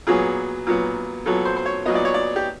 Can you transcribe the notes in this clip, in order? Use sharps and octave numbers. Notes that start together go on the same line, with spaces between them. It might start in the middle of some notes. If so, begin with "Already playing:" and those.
A#2 F#3 B3 G#4
A#2 F#3 B3
A#2 F#3 B3 A4
C5
C5
C#5
A#2 F#3 B3 D#5
D5
C#5
D5
G4